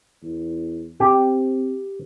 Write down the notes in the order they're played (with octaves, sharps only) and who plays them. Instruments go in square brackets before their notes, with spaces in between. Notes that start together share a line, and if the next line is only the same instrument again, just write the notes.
[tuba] E2
[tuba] C4 [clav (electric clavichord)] G4